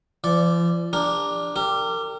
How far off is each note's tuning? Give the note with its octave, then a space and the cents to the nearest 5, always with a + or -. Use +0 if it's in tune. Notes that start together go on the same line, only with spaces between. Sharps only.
F3 -40 D5 -5
D4 +0 G4 +40 A#4 +0
G4 +0 A#4 -35